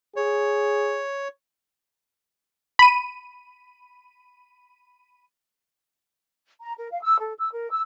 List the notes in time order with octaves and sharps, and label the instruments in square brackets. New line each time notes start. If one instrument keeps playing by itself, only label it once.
[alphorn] G#4 [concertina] C#5
[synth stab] B5 D#7
[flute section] A#5
A#4
F5
E6
A4
E6
A#4
E6